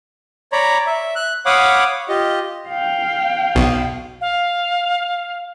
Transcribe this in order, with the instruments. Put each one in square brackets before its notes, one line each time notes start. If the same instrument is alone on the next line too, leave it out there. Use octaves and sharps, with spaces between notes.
[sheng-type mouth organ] C#5 D5 A#5 B5
E5
F#6
C#5 F5 F#5 B5 D6 D#6
F4 G4 D#5
[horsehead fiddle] F5 G5
[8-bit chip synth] B1 B2
[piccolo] F5